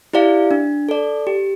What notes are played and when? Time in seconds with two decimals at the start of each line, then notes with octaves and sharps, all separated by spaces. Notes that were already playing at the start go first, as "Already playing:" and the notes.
0.13 E4 G4 D5 F5
0.51 D4
0.89 A4 D5
1.27 G4